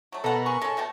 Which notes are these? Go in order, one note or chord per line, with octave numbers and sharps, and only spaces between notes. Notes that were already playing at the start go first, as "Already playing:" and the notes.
F#3 A3
B2 A4 A#4 D#5 F#5
G#4 C#6
G#3 C#4 A4
B2 A3 G5